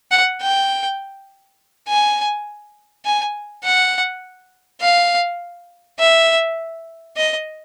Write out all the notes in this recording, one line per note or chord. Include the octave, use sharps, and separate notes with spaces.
F#5
G5
G#5
G#5
F#5
F5
E5
D#5